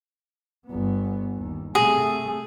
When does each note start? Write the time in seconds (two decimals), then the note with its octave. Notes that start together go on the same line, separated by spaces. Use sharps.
0.67 G1 B3
1.38 D#2
1.75 C3 A3 G#4